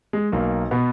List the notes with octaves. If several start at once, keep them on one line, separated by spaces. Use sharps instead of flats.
G#3
B1 A#3
B2 B3